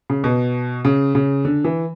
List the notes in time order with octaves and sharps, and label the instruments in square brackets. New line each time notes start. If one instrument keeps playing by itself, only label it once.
[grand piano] C#3
B2
C#3
C#3
D3
E3